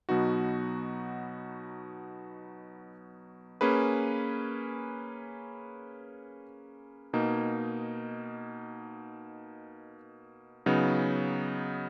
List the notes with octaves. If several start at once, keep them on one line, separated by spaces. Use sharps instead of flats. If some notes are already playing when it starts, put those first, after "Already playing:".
B2 F#3 B3 D#4 F#4
A#3 C#4 G#4 B4
B2 A#3 D#4
C#3 F#3 B3 D#4